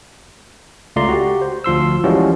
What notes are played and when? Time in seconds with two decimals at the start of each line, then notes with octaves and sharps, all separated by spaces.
0.96 C#2 A3 F4 D5 A#5 C6
1.09 F#4 G4
1.42 C5
1.64 D2 F3 C6 E6
2.04 E3 F3 G3 G#3 C#4 F#4